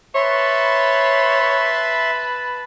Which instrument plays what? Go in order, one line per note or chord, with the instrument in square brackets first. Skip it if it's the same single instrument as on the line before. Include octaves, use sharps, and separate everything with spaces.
[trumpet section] B4 A5 B5 [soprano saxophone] C#5 [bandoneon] E5 C6